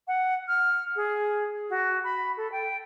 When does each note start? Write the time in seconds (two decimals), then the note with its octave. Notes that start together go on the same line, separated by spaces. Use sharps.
0.07 F#5
0.48 F6
0.95 G#4
1.69 F#4
2.03 B5
2.37 A4
2.51 G5